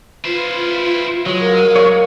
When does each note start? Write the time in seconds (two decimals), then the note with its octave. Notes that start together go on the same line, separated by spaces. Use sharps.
0.25 E4 F4 B4 C5
1.26 F#3 G#3
1.41 A#4 F5
1.76 C#5 F5 C#6